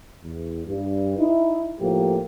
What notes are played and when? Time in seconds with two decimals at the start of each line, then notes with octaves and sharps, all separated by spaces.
0.24 E2
0.66 G2
1.18 D#4 E4
1.80 A2 F3 A#3 G4